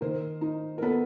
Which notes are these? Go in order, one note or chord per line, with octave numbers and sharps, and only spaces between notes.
D#3 A#4 C5
D#4
A#4
B3 A4 B4